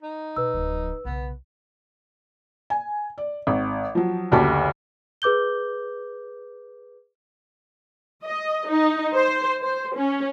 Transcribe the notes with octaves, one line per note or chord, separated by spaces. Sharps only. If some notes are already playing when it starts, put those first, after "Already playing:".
D#4
B2 B4 E6
D1 F3
B1 C#3 B3
G#5
D5
G#1
F3 F#3
F#1 D2 F#4 G4 A5
G#4 B4 D6 G6 G7
D#5
D#4
C5
C5
C#4